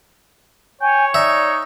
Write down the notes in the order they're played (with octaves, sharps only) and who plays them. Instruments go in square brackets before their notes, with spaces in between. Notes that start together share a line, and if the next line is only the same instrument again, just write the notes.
[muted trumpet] C#5 [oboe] G5 [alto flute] G#5
[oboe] D#4 [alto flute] D5 [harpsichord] E5